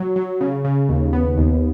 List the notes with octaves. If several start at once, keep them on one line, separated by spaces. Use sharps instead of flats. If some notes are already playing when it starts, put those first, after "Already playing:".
Already playing: F#3
F#3
C#3
C#3
D#2
B3
D#2